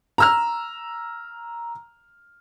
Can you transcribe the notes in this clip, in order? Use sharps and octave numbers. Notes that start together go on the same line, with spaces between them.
A#5 E6 F6